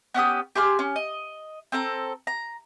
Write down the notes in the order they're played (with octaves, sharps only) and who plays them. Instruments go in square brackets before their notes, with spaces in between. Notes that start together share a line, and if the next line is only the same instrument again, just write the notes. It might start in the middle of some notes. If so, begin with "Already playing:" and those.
[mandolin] B3 C#4 G4 D#6
G4 G#4 C6 F6
C#4
D#5
C4 A4 A#5
A#5